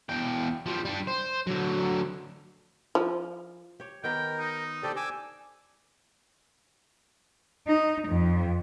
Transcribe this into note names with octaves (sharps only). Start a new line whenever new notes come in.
E2 G5
F3 G3
G3 D4
C5
D3 F#3
F3
G4 C#5
D#3 B3 G4 A#4 G5
D#4
D4 G4 A4 C5 D5
G#5 D6 E6
D#4
F2